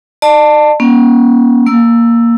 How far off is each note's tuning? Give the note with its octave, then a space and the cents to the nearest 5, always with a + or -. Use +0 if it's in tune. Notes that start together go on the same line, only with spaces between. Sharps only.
D5 +40 A5 +20
A#3 +45 C#4 +0
A#3 +0 E6 +5